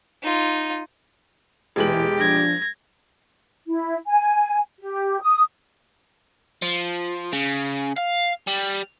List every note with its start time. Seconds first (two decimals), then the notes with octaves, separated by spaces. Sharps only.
0.23 D#4 F4
1.76 E1 A#2 E3 G#3 G4 F#7
2.19 F3 D4 G#6 A#6
3.67 E4
4.07 G#5
4.80 G4
5.22 D#6
6.62 F3
7.33 C#3
7.96 F5
8.47 G3